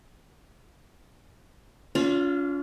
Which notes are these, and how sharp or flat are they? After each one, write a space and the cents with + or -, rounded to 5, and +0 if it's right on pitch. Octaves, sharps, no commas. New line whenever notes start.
C#4 +45 F4 +15 F5 -30